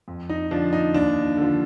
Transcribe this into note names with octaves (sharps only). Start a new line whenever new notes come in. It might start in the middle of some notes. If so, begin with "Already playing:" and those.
F2
D#4
D3 F3 D4
D#4
D#2 D4
D3 F3